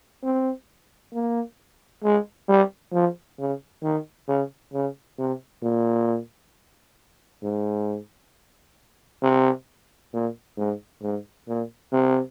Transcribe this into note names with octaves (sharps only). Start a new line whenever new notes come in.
C4
A#3
G#3
G3
F3
C#3
D#3
C#3
C#3
C3
A#2
G#2
C3
A#2
G#2
G#2
A#2
C3